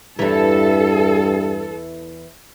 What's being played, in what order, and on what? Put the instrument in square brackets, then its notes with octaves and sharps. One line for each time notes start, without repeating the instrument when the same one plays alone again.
[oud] E2 E3 [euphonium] G2 [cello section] A4